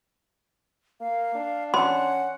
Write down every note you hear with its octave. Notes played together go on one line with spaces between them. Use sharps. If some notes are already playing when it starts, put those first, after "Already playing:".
A#3 F5
D4
C#4 F#5 C6